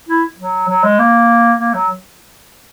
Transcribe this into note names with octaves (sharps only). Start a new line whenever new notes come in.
E4
F#3
F#3
G#3
A#3
A#3
F#3